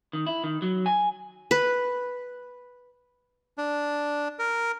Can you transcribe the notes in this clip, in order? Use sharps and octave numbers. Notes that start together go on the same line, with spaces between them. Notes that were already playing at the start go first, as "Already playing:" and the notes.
D#3
E4
D#3
F#3
G#5
B4
D4
A#4